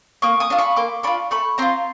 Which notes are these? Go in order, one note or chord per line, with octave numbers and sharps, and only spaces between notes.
A#3 C#6 D#6
C#6 D#6
D4 F4
B5 C#6
A#3 C6 D6
D4 F4 B5 C#6
A3 B5 C#6
C4 F4 A#5 C6